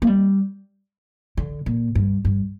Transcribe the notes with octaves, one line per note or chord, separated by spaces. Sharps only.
A#3
G3
D3
A#2
G2
G2